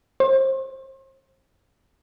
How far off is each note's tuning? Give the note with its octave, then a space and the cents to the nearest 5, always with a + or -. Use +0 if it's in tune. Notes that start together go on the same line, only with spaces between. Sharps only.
C5 +30